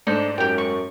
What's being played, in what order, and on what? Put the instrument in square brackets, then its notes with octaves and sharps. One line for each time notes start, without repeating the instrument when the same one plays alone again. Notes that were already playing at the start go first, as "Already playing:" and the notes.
[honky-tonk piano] G#2 A3 [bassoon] D4 [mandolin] D#4 A4 C5
[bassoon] F#2 [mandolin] G4 G5
[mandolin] C#6